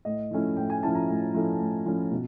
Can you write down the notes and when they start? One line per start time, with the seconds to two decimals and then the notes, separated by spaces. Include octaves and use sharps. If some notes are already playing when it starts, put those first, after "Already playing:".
0.05 A2 D#5
0.31 F3 A3 C#4 E4
0.57 A2 G5
0.70 G#5
0.83 F3 A3 C#4 E4 A5
0.95 A#5
1.09 A2
1.34 F3 A3 C#4 E4
1.60 A2
1.86 F3 A3 C#4 E4
2.12 B2